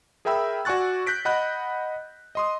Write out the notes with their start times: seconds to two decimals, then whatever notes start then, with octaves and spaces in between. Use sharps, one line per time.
0.25 G#4 A#4 E5 G5 B5 E6
0.65 F#4 D5 G#5 C#6 F#6 A6
1.07 F#6 G6 A#6 B6 D7
1.25 D#5 F#5 B5 F#6 G6
2.35 D#5 C6 D#6